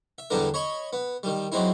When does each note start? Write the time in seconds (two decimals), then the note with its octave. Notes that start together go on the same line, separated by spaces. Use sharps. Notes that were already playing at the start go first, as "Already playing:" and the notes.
0.18 E5
0.30 E2 D3 G3 B3 D4 A#4
0.54 C#5 D#5 B5
0.93 B3
1.23 D#3 G3
1.52 F#3 G#3 C4 D#4 E4